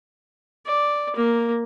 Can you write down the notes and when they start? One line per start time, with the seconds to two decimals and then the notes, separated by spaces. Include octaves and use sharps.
0.66 D5
1.16 A#3